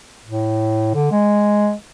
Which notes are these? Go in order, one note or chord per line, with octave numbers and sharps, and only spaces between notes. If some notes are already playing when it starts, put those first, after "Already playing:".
A2
D3
G#3